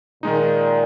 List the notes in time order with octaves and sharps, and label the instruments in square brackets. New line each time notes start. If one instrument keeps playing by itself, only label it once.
[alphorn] A#2 [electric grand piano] D#3 G#3 D#4